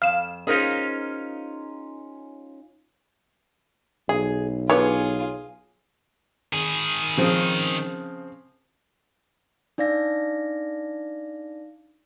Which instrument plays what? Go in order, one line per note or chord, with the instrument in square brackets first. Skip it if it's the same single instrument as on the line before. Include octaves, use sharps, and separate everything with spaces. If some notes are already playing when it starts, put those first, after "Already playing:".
[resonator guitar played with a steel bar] F2 [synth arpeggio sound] F5 E7
[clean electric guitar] C#4 D#4 F4 [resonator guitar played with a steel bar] G#4 A#4 C5
[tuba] B1 [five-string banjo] G#4
[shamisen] D3 E3 B3 [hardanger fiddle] F4 G#4 [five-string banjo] C#5
[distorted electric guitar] D#3 G#4
[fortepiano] C#3 F3 C4
[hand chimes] D4 D#4 D5 F5 A#6